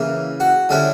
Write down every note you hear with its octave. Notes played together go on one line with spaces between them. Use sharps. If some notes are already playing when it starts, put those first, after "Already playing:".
Already playing: C#3 E3 A#3
F#4
D3 G3 C#4 E4